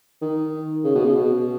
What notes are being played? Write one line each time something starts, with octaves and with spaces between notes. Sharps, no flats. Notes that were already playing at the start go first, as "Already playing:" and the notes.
D#3
C#3
B2
C#3
B2